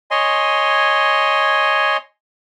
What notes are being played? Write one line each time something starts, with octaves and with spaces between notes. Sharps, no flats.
C#5 D#5 G#5 C6